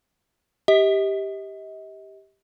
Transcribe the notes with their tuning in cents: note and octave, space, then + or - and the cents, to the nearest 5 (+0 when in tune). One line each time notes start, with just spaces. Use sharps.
G4 +0 D#5 +40